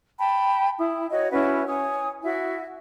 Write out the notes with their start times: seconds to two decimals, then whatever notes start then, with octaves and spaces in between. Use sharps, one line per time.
0.19 G5 A5 B5
0.78 E4 D#6
1.10 F#4 C#5 D#5
1.31 C#4 E4 F#4 B4
1.66 C#5 G#5 D#6
2.23 E4 F#4